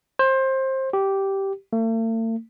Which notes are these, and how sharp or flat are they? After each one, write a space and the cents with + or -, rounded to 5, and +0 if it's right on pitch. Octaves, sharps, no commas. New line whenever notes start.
C5 +20
G4 -10
A3 +45